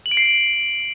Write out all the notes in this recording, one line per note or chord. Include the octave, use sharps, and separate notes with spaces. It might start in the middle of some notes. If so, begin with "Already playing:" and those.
F#7
D7
C7